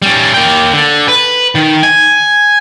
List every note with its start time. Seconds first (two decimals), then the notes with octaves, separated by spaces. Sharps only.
0.02 G3 C#4
0.34 A#3 G5
0.72 D3
1.08 B4
1.55 D#3
1.83 G#5